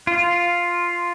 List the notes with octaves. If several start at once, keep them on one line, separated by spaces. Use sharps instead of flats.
F4